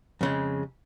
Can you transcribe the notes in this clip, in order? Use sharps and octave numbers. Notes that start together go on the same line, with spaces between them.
F2 C#3 G#3